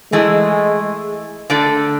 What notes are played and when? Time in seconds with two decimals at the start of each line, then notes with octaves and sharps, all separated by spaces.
0.12 E3 G#3 A3 E4 G#4
1.50 D3 A3 D4 A4